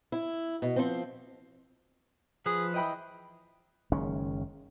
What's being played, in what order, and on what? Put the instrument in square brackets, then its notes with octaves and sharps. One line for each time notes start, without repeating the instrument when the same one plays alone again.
[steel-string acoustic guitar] E4
B2
F3 C4
[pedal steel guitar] F3 B4 [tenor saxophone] G#4
[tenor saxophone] E3 [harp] D#5 G5 B5
[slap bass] F#1 D#3 G#3 C#4